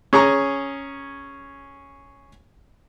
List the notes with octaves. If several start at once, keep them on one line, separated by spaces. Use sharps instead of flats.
C#4 G#4 A#5 C#6